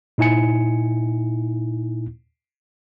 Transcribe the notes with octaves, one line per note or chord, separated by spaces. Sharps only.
A#2 D#4 E4 G#5 C#7